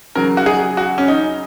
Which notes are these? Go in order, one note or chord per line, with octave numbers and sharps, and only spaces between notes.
C#3 F#3 A#4
F#4
G#4
F#4
C#4
D#4